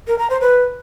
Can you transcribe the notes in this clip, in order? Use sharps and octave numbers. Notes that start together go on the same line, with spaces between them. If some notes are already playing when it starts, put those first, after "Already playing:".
A#4
A#5
C5
B4